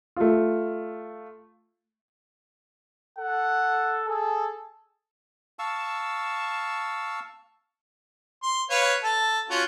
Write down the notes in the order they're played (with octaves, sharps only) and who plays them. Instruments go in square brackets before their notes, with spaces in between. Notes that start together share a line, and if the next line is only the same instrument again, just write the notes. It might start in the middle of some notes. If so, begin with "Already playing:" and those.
[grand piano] A3 F4
[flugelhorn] A4 [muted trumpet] F#5
[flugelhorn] G#4 [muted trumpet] A4
[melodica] F5 A5 C#6 E6
[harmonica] C6
B4 C#5 F5
A4 A5
C#4 F4 F#4